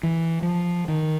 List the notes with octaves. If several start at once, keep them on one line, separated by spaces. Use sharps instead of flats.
E3
F3
D#3